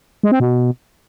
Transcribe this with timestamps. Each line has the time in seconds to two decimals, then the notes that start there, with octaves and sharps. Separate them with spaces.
0.23 G#3
0.32 C4
0.40 B2